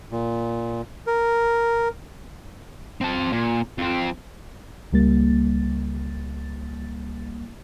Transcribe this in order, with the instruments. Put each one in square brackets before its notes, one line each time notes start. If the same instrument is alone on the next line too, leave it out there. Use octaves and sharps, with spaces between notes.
[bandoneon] A#2
A#4
[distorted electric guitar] C4 A5
A#2
F2 C4
[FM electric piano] C#2 G3 A#3 A6